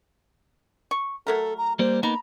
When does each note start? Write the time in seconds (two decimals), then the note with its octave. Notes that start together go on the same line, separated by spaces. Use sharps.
0.91 C#6
1.27 F#3 A3 A4 A#4
1.57 A#5
1.79 G3 A#3 C5
2.03 A#3 B3 D#4 A#5 B5